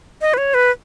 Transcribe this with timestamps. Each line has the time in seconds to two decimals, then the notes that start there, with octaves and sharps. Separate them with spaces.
0.21 D#5
0.34 B4
0.38 C#5
0.54 B4